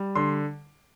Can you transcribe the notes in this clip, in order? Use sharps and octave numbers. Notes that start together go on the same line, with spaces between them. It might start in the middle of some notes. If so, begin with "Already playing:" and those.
Already playing: G3
D3 C6